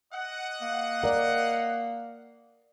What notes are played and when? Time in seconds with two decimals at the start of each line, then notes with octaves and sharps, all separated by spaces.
0.13 D#5 F#5
0.61 A#3
1.03 A#4 D5